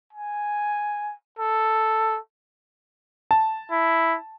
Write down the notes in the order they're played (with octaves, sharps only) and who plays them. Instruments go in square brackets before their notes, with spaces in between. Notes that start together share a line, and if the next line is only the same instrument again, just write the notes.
[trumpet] G#5
A4
[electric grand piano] A5
[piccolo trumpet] E4